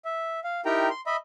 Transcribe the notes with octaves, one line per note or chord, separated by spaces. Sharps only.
E5
F5
D#4 E4 G4 A#4 G5 A#5
C6
D#5 E5 B5